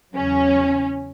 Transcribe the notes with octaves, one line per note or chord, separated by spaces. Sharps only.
E2 C#3 F#3 C#4